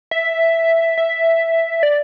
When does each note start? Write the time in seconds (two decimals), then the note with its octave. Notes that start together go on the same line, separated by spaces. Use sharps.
0.11 E5
0.98 E5
1.83 D5